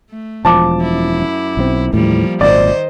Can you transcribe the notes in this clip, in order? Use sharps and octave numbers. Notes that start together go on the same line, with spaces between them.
A3
E1 F3 A5 D6
F#2 E4
B1 E3 C4
D#2 A2 E3 F3 G3 A#3
G#1 F#2 A#2 D#3 C5 D5 D#5